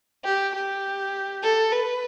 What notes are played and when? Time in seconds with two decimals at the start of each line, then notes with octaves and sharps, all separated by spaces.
0.25 G4
0.55 G4
1.43 A4
1.72 B4